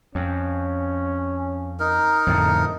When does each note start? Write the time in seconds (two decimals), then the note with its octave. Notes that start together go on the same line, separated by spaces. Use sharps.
0.15 F2 C#4
1.80 D#4 A#4
2.27 F2 A2 D3